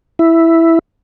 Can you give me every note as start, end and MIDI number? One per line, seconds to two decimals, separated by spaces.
0.19 0.79 64